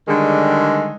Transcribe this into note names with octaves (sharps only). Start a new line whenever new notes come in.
D3 D#3 G3 G#3